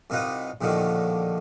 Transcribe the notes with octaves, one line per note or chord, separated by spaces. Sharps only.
C2 C3 D#4 F4 B4 F#5
A#1 D#2 A2 D3 D#3 F3